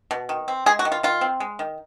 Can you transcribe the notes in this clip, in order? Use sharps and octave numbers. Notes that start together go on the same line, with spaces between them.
B2
D#3
C4
G#3 G#4
F#4
D#3
F4
D#3 F4
C4
G#3
D#3